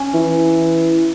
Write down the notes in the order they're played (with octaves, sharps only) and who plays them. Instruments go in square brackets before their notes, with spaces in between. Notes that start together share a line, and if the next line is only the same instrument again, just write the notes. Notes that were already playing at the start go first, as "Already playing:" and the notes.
Already playing: [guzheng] C#4
[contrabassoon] E3